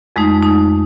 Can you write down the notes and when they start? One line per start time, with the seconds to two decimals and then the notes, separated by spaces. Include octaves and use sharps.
0.16 F2 G#3 A3 D#4
0.43 D#4